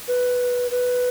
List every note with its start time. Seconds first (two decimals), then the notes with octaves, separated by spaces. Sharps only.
0.08 B4
0.71 B4